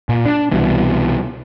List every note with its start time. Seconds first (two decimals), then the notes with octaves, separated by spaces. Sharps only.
0.09 A#2
0.25 D4
0.51 C2 B2 E3 G3